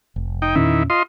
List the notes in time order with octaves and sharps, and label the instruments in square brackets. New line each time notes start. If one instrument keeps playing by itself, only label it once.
[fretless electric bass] F1
[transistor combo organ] D#4 G5
[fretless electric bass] E2 A#2 C#4 [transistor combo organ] D#3 E4
[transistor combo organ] F4 D#5 C6